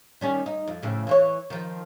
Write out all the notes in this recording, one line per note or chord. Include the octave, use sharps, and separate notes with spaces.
D#3 G3 C#4
D#4
F2
F2 A2 C#3
E3 F4 C#5
D#3 F3